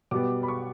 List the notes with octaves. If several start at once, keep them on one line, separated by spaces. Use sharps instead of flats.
B2 G3 B3 D6
B5
C#6